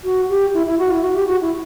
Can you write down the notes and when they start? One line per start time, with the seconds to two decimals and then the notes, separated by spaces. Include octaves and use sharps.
0.04 F#4
0.29 G4
0.54 E4
0.66 E4
0.79 F#4
0.91 E4
1.03 F#4
1.15 G4
1.28 F#4
1.41 E4